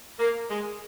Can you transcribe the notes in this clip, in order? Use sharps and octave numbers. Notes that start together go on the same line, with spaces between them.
A#3
G#3